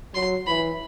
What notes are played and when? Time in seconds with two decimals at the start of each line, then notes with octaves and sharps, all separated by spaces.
0.14 F#3 C6
0.46 E3 B5